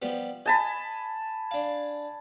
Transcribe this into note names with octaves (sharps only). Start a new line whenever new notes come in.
F3 G3 B3
D#5 G#5 A5 B5
D4 F5